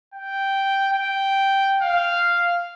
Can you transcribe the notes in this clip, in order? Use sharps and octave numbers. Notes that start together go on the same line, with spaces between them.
G5
G5
F5